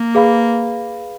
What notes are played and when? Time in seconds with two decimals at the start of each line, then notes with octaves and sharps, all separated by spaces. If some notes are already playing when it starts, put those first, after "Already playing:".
Already playing: A#3
0.15 G#4 B4 F5 B5